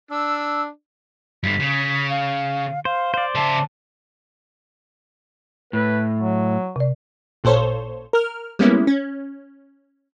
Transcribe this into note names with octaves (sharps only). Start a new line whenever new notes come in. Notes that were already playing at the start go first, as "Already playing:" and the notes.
D4 E6
G2 D3 B6
C#3
F5
C5 F5
C5 D5
C#3 E5 A5
A2 B4
F#3
C3 D5
A1 A#2 A4 C5 C#5
A#4 F6
G3 G#3 A#3 B3 C#4 E4
C#4